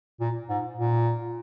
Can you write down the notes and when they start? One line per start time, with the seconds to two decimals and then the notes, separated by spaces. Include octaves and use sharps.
0.21 A#2
0.49 G#2
0.78 A#2